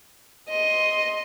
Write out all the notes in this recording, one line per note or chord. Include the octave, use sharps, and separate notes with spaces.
D#5 C6